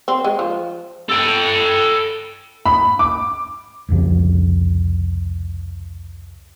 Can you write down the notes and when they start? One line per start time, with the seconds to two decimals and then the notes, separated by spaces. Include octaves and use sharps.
0.08 C4
0.24 G#3
0.39 F3
1.09 A4 G5
2.66 B5
2.99 D6
3.89 C2 F2 C#3 F3